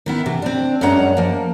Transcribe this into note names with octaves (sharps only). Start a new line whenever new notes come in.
D#3 B3 E4
C3 E3
C4 D4
F#2 G3 G#3 D4 F#5 A#5
F3 A#3